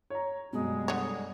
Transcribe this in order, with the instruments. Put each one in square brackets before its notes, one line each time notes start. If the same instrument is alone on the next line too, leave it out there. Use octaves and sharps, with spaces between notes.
[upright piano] C#5 A#5
[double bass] F#2 G3 [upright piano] B2 [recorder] G#3
[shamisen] D3 C#5